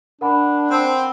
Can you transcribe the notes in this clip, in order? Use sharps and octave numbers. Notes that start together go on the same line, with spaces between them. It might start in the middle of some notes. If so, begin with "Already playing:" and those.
D4 A#4 F#5 B5
C4